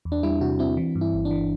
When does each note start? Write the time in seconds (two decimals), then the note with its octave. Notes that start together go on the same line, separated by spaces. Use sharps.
0.05 E2
0.12 D4
0.23 G3 E4
0.41 C3 F#4
0.59 C4 E4
0.77 E3
0.95 G2
1.01 E4
1.13 G1
1.25 D4
1.31 E3